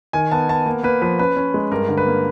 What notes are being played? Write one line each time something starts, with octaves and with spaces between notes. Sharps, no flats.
D#3 G#5
B3 A5
B3 A5
A#3
A#3 B4
F3 B4
C#4 B4
C#4
G#3
G2 A#4
D3
B4
A#3